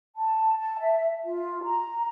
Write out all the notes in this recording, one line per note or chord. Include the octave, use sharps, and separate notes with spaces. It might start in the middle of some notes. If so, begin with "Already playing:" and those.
A5
A5
E5
F4
A#5